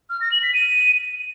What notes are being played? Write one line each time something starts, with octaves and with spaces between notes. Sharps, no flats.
F6
A#6
F#7
B6
D#7